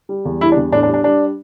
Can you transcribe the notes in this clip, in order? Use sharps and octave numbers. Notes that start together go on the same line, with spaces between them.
G3
E2
G3 E4
D4
E2
A2 D4
D4
G3
D4
G3 D4